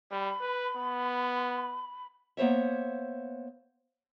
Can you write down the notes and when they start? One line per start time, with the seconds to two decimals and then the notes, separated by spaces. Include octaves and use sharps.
0.11 G3 B5
0.41 B4
0.77 B3
2.37 A#3 B3 C5 C#5 E5